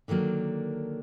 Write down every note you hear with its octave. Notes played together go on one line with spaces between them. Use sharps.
D3 D#3 F#3 A#3 D4